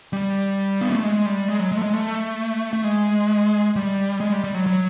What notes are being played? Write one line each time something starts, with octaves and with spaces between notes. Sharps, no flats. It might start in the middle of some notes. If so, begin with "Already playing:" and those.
G3
B3
A#3
A3
G#3
G3
G#3
F#3
G#3
A3
G#3
A3
A3
G#3
G3
G#3
G3
G3
F#3
F#3